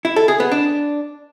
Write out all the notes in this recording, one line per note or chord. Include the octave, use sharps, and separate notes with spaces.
E4
A4
G#4
B3
D4